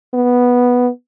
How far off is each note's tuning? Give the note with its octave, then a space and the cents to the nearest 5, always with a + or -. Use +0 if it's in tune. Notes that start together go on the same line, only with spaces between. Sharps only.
B3 -5